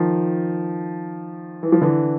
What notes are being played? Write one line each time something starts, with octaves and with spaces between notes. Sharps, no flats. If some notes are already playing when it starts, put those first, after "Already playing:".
Already playing: D#3 F3
E3
F3
D3 E3